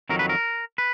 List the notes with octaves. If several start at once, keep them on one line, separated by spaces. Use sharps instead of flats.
F2 D#3 F#3 A#4
B4
A#4
B4